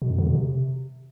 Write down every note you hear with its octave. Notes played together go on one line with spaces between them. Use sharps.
B2
F2
D3
B2
C3